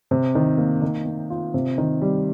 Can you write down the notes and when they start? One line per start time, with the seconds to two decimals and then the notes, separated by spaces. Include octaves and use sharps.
0.11 C3
0.35 D#3
0.58 A#3
0.82 D#3
1.06 A#3
1.30 F4
1.54 C3
1.78 D#3
2.02 G3